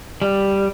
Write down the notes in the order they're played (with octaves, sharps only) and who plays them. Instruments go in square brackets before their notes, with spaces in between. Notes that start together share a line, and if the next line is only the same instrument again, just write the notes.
[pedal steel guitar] G3